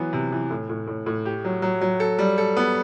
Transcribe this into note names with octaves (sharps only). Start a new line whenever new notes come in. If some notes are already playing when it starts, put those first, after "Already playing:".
Already playing: E3 F#3 B3
C3
E3
A2
A2
A2
A2
G4
F#3
F#3
F#3
A4
G3
A4
B3